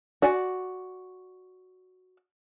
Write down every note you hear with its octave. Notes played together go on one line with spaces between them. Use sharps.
F#4 D5 G#5